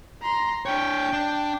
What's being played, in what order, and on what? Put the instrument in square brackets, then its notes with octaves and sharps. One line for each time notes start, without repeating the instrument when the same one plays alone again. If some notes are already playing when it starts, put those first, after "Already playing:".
[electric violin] A#5 C6
[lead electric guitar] D4 C#5 [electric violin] G5
[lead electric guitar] D4